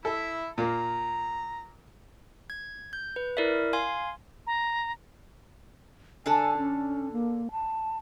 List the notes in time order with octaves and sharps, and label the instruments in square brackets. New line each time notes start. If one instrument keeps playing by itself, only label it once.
[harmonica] E4 E5 [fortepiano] A4
[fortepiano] A#2 A#3 [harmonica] A#5
[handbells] G#6
G6
B4
E4 A#4 D5 E5
F5 G#5 C6 G#6
[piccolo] A#5
[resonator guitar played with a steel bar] D3 D4 A4 [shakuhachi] G#5
[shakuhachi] C#4
A#3
A5